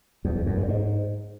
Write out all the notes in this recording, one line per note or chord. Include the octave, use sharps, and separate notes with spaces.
E2
E2
F#2
G2
G#2